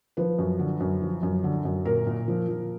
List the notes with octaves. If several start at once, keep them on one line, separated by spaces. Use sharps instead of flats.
F3 B4
F#2
D3
F#2
F3
F#2
D3
F#2
A#2 A#4
A#2
F3
F3